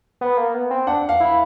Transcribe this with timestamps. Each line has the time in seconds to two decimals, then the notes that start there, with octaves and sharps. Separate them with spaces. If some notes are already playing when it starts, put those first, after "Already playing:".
0.21 B3
0.37 A#3
0.54 B3
0.71 C4
0.87 D4 F#5
1.09 F5
1.20 E4